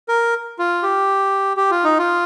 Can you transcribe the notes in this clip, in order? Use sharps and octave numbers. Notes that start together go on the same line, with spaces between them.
A#4
F4
G4
G4
F4
D#4
F4